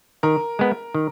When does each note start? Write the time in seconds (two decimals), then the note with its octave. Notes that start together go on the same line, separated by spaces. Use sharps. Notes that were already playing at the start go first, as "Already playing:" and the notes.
0.23 D#3 A#4
0.59 G#3 B3
0.95 D#3